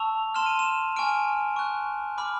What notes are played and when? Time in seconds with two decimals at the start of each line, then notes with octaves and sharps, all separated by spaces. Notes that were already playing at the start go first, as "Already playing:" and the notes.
Already playing: A5 C#6 E6 F7
0.34 A5 C6 F6 E7
0.46 D#7
0.59 E7
0.96 G#5 C#6 F6 D7
1.56 C#6 F#6
2.18 B5 D6 F6